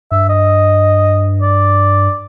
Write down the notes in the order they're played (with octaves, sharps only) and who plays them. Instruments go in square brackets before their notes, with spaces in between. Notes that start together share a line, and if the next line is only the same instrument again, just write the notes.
[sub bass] G2 [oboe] E5
[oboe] D#5
D5